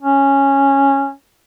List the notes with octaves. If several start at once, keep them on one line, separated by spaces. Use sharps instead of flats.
C#4